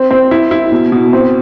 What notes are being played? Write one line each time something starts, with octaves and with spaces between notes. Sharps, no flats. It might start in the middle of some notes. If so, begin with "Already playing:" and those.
Already playing: C4
C4
E4
E4
B2
B2
C4